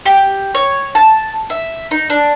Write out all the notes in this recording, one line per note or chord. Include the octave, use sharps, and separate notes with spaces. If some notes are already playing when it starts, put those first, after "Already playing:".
G4
C#5
A5
E5
D#4
D4